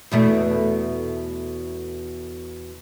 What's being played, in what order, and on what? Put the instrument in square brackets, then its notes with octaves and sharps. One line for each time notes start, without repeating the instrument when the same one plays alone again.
[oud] E2 B2 A3